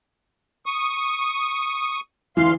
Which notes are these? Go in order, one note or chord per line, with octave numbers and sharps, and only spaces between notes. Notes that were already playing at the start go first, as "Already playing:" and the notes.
C#6 D#6
D2 E3 F5 C6